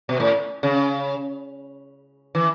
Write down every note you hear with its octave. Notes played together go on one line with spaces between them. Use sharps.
B2
A2
C#3
E3